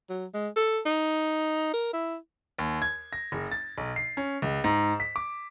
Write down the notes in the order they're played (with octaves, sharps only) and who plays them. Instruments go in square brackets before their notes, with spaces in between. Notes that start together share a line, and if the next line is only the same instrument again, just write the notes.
[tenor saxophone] F#3
G#3
A4
D#4
A#4
E4
[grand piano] D#2
G#6
A#6
F#1
A6
B1
C7
C#4
C#2
G#2
B6
D6